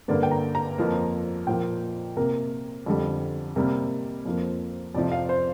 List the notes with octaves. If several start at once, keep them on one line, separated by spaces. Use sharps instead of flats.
G2 D3 A#3 D5
G5
A#5
A#5
F2 F3 A#3
A#2 F3 A#3 G5
C3 A#3 A#4
F2 D3 G3
C3 G3 A#3 A#4
F2 F3 A#3
F2 C3 F3 D5
F5
C5